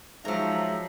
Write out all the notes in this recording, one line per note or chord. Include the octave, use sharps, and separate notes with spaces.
G#2 F3 F#3 E5 A#5